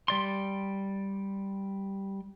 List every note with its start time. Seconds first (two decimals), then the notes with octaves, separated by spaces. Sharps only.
0.08 G3 D5 C6